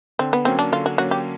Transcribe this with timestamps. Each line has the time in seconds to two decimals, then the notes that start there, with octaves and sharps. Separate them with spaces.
0.19 D3 C4
0.33 B3
0.45 F#3 A#3 C4 C#4
0.59 D4
0.72 D3 F4
0.86 F#4
0.98 F#3 A#3 C#4 F#4
1.11 G4